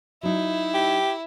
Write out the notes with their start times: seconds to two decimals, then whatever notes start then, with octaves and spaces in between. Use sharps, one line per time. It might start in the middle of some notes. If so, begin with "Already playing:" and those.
0.23 F#3 D#4 E4
0.74 G4